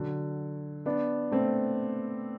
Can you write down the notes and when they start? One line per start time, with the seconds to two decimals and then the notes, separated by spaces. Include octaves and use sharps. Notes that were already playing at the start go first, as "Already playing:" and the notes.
Already playing: D3 F#3
0.86 B3 D4
1.31 A3 C4